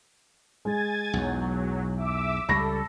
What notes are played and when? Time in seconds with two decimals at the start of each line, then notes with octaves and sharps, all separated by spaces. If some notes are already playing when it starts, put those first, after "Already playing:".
0.65 G#3 G#5 G#6 A6
1.13 B1 E2 F#3
1.96 E5 D6 E6
2.49 C#2 G3 A4 B5 C#6 A#6